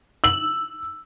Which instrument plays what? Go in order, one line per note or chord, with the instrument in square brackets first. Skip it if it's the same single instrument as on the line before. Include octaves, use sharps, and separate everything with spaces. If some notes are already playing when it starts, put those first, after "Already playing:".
[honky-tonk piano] E6 F#7